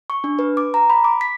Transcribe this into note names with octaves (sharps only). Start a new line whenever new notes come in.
C#6
D4
B4
D6
A#5
B5
D6
B6